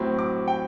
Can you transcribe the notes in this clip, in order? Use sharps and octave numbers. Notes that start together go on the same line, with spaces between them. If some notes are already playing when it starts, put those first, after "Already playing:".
Already playing: A2 F#3 C4
D6
G5